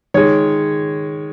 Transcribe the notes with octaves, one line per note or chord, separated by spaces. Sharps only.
D#3 G#3 C#5